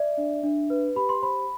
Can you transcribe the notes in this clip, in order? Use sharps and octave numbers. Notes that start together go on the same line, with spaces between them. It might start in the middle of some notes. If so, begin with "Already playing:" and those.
Already playing: D5 E5
D4
D4
B4
G4 B5
C6
C5 B5